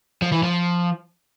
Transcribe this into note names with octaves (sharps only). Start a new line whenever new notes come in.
F3
E3
F3